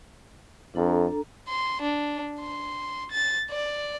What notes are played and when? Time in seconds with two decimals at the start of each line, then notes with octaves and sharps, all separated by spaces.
0.75 F2 D4 A4 A#5
1.49 C6
1.82 D4
2.40 C6
3.12 A6
3.51 D5